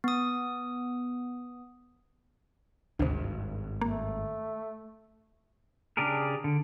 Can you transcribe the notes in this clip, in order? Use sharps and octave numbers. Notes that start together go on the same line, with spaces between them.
B3 D#6
G#1 D2 G2 C3
A3 A#3
C#3 D4 G4 G#4 A#4
D3